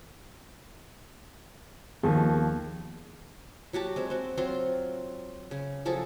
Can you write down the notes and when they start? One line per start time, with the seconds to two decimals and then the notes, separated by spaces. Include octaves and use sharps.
2.03 D#2 D#3 F3 B3 G#4
3.73 F#3 F#4 G4 A5
3.96 G#3 C4
4.10 C4 F#4
4.37 F#3 C4 F4 C6
5.51 C#3
5.85 F3 F#3 G#4 A4